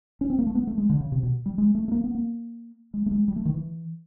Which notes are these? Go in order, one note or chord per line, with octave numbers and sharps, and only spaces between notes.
C#4
C4
A#3
A3
B3
A3
G#3
D3
C#3
C3
B2
G3
G#3
A3
A3
A#3
B3
A#3
G#3
A3
G#3
G3
A3
D#3
E3